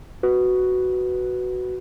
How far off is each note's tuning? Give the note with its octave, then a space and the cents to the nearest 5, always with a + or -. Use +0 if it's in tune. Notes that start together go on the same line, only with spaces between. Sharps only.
F#4 +5 B4 +0